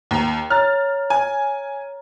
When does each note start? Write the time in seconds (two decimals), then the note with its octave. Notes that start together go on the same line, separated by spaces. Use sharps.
0.11 D#2 A#5
0.50 C#5 A#5 F6 A6
1.10 G#5